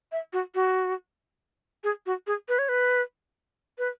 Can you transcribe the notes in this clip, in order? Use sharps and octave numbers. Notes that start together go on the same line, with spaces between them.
E5
F#4
F#4
G#4
F#4
G#4
B4
C#5
B4
B4